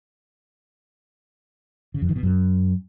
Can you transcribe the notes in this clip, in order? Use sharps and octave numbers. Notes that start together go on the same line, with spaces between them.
C#3
F2
D#3
B2
F#2